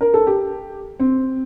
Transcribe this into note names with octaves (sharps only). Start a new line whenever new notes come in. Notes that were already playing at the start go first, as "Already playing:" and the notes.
A#4
A4
G4
C4